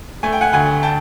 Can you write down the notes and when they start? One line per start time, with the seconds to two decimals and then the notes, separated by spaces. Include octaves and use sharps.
0.23 A3 G#5
0.33 G5
0.41 F#5 G#5
0.53 D2 F#5 G#5
0.83 G5 A5